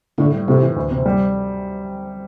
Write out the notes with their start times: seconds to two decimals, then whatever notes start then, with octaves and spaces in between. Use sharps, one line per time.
0.18 A2 D3
0.33 G3
0.48 A2 C3
0.62 E3
0.76 D2
0.91 C3
1.06 G3